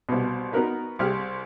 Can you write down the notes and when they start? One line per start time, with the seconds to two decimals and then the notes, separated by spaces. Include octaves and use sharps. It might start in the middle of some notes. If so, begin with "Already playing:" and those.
0.09 C2 B2
0.53 B3 D#4 F#4 A#4 B4
0.99 C2 G4 G#4 F6